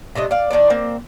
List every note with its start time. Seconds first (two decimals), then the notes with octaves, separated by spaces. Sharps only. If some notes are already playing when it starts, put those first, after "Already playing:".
0.15 C3 A3 D4 D#5
0.31 D5 F5
0.50 D#3 B3 D4 D5
0.70 A#3 C4